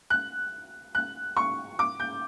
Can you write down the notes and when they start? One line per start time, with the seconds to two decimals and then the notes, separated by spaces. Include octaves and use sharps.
0.10 F#6
0.95 F#6
1.37 C#6
1.79 D6
2.00 G6